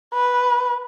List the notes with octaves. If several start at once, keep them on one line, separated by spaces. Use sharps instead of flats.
B4